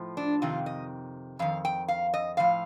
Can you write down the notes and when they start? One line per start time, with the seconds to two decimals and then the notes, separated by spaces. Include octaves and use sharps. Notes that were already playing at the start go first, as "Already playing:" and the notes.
Already playing: A2 F3
0.17 D4
0.42 F2 C3 D#3 F4
0.66 D#5
1.39 F2 D#3 F5
1.65 G5
1.88 F5
2.14 D#5
2.37 A2 F3 F5